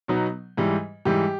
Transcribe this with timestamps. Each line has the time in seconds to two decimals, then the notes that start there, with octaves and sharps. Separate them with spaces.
0.08 B2 F#3 B3 D#4
0.57 G#2 E3 G3
1.05 G#2 E3 G3 G4